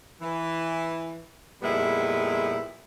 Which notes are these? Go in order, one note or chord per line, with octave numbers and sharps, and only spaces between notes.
E3
F2 A#2 G3 G#3 B3 E4